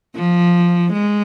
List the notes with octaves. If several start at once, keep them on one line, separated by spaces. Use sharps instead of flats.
F3
G#3